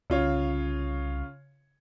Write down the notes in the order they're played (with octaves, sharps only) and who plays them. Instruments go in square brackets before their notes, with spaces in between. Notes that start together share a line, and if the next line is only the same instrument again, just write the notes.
[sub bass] C2 [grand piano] C#3 F4 C#5